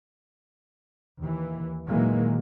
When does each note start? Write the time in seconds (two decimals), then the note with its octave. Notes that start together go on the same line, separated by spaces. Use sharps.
1.21 D#2 E3
1.88 A#2 D#3 E3 F#3 G#3 A#3